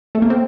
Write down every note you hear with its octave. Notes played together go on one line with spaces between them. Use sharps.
A3
A#3
C4